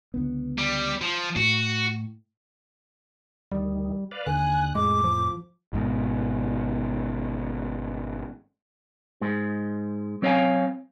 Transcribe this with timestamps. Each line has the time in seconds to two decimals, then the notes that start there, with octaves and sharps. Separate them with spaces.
0.14 C#2 D3 B3
0.58 G3
1.02 F3
1.36 A2 F#4
3.52 D2 D#3 G3
4.11 B4 D5 F5
4.27 D#2 D3 G#5 F#6
4.75 F2 A2 G#3 D6
5.04 F3
5.73 G#1 G#2 B2
9.21 G#2 G#3
10.22 F#3 C4 C#5 D#5 F5 G#5